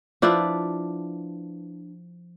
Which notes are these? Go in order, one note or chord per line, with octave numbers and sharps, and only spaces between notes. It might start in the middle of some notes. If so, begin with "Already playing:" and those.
F3 D4 E4 B4